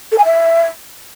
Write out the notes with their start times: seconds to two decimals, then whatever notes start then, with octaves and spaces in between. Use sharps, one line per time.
0.12 A4
0.18 G#5
0.25 E5